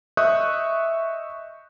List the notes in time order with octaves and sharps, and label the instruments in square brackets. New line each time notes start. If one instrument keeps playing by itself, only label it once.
[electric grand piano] D#5 E5 C#6 D#6 F#6 G6